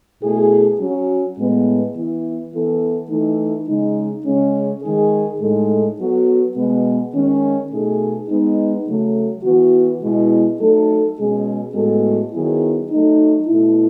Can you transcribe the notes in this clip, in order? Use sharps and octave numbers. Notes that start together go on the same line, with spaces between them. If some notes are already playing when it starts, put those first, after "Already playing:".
B2 A3 E4 G#4
F#3 C#4 F#4
A2 G#3 B3
E3 B3 E4
E3 B3 E4 A4
E3 A3 D#4
C#3 G#3 D#4
C#3 G#3 C#4
D#3 G#3 D#4 G#4
A2 G#3 D#4 A4
F#3 B3 F#4 A4
B2 G#3 B3
D#3 G#3 C#4
B2 A3 D#4 G#4
G#3 B3 D#4
C#3 F#3 A3
E3 B3 F#4
B2 G#3 B3 E4
F#3 A3 D#4 A4
B2 G#3 C#4 G#4
A2 G#3 B3 F#4 A4
D#3 F#3 B3 E4 G#4
F#3 A3 D#4
B2 A3 E4